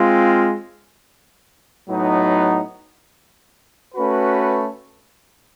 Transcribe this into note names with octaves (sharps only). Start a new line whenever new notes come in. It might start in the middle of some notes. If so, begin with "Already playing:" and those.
Already playing: G#3 C4 F4
A2 F#3 B3 D#4
A3 C#4 F#4 B4